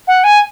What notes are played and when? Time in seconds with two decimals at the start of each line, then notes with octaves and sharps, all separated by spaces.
0.08 F#5
0.24 G#5